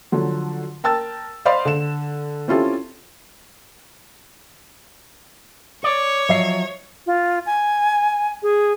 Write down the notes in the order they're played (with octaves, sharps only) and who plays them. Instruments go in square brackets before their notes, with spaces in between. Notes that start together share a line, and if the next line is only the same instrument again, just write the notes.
[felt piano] D3 F3 F#3
A#4 G5 A5 E6 A6
C5 D5 D#5 F5 B5 C6
D3 E7
C4 C#4 E4 F4 G4 A4
[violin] C#5 [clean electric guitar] D5
[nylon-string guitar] F3 F#3 [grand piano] D#5 E5 C7
[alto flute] F4
G#5
G#4